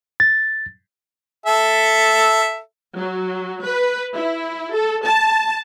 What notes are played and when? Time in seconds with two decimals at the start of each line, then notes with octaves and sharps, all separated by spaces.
0.20 A6
1.46 A4 E5
2.96 F#3
3.65 B4
4.14 E4
4.74 A4
5.05 A5